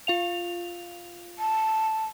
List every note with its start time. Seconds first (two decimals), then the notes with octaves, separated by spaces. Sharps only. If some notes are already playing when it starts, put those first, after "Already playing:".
0.07 F4 F5 F7
1.39 A5